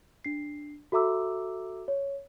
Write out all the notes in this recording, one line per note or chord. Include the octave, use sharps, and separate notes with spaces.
D4 C7
F#4 A4 E5 A#5 D6 E6
C#5